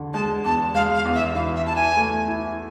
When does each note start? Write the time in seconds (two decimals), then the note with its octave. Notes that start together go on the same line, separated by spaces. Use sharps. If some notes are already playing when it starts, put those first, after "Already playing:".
Already playing: E2 D3
0.13 G#3 A5
0.44 E2 A5
0.75 G#3 F5
0.95 F5
1.05 E2
1.15 E5
1.35 E3 F5
1.56 E5
1.66 E4 A5
1.76 G#5
1.97 A3
2.27 E4